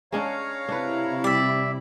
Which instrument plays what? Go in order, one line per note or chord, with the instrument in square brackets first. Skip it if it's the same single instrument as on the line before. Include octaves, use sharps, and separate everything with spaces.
[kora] G#3 C#4 D4 [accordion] C#5 F5 A#5
[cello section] C3 E4 [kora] D4 B4
[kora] G3 [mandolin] D5 E5